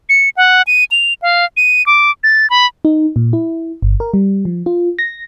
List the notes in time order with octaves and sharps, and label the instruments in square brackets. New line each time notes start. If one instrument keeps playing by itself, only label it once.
[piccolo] C#7
F#5
D#7
F7
F5
D#7
D6
A6
B5
[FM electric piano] D#4
A#2
E4
G1
A#4
G3
F3
F4
A#6